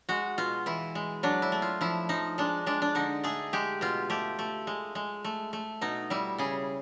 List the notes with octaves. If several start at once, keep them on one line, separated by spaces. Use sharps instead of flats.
G#3 F#4
B2 F4
E3 E4
G#3
F#3 D4
E4
A3
F4
F3 E4
F3 D#4
G#3 D4
G#3 D4
D4
D3 D#4
A3 G#4
G#3 G4
B2 F4
A3 G4
A3
G#3
G#3
A3
A3
B2 D#4
G3 E4
C#3 G#4